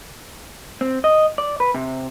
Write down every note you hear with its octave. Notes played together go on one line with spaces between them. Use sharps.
C4
D#5
D5
B4
C3